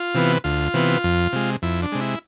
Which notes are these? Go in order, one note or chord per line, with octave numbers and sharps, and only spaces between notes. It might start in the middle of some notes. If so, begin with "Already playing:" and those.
Already playing: F4
C3 E3 B3
D2 F4
C3 E3 B3
F2
C3 G#3
F2 E4
D4
C3 G#3
E4